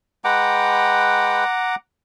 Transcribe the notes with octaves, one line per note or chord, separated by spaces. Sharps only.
G#3 B4 F#5 G5 A#5 D6